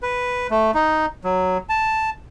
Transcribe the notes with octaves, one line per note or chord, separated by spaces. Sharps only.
B4
A3
D#4
F#3
A5